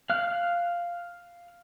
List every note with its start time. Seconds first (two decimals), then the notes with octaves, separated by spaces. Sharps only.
0.10 F5 F6 F#6